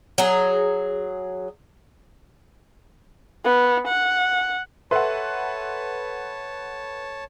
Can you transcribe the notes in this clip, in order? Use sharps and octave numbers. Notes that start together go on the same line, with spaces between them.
F#3 G#4
B3
F#5
A4 B4 C#5 E5 F#5 A5 C6